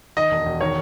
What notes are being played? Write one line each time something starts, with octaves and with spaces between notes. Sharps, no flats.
D#3 D#5
E1
E1
D#3 C#5